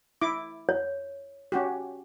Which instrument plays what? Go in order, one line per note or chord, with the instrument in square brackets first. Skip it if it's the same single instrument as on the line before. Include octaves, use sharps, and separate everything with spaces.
[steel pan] E4 D6
[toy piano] C#5
[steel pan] C#4 F#4 G4